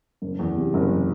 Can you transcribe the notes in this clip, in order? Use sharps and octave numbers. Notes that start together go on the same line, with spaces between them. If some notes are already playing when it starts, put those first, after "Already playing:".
F#1
E2
C3
F#1